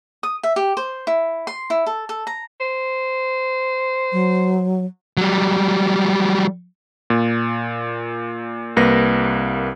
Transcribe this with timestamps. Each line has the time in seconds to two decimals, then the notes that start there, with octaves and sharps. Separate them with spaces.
0.23 D#6
0.43 E5
0.56 G4
0.77 C5
1.07 E4
1.47 C6
1.70 E4
1.86 A4
2.09 A4
2.27 A#5
2.60 C5
4.12 F#3
5.17 F#3 G3
7.10 A#2
8.77 C2 A#3 B4 A#6